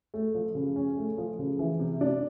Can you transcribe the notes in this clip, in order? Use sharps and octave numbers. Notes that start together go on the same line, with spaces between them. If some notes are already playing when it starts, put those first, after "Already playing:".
A3
F3
C#3
C#4
A3
F3
C#3
E3
C3
D4